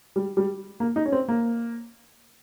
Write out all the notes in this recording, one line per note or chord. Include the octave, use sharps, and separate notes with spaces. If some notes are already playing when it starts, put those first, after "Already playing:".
G3
G3
A#3
D#4
C#4
C4
A#3